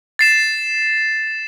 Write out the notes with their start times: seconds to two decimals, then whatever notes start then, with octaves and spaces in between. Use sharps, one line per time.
0.19 A6 C7 E7